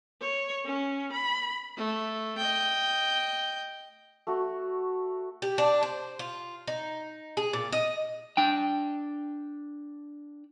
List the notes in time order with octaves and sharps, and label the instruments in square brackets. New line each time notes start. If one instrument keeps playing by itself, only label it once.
[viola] C#5
C#4
B5
[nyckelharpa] A3
D#5 G5
[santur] A3 F#4
[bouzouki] G4
D4
C5
F4
D#4
G#4
A#2
D#5
[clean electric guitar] D4 G5